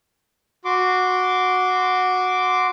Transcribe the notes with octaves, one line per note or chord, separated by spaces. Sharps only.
F#4 C6 D6